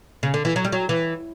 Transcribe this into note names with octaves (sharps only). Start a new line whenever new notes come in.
C#3
D3
E3
F#3
G3
F#3
E3